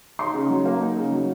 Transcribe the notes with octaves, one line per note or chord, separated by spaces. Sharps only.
D#4 C6
C#3
F#3
A#3
D#4
C#3
F#3